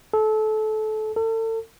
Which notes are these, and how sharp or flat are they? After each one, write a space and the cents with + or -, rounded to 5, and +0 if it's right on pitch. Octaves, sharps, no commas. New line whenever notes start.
A4 -25
A4 +35